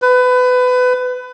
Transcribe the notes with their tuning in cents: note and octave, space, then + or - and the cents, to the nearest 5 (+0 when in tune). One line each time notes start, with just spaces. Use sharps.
B4 +25